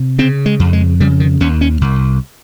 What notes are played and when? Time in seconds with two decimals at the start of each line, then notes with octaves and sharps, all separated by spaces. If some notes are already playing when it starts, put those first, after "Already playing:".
Already playing: C3
0.19 C#3 C4
0.46 G#3
0.60 F2
0.73 G#3
1.00 C#3 G3
1.20 D#3
1.40 D#2 C#4
1.61 C#4
1.81 C2